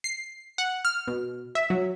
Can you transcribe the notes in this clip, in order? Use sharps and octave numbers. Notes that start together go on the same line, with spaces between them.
C7
F#5
F6
B2
E5
F#3